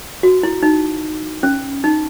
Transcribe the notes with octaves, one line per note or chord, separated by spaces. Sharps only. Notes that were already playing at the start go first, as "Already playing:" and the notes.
F#4
E4
D#4
C#4
D#4